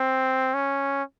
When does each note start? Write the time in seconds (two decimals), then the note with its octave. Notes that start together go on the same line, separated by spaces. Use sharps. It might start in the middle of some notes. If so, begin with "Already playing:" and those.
Already playing: C4
0.54 C#4